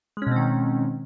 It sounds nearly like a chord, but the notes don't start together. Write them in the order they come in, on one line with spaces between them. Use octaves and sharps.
G#3 C#4 B2 C4 D#3